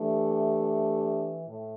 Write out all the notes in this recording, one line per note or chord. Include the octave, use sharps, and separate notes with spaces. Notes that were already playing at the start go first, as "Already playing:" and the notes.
Already playing: E3 A3 D4 G4
A2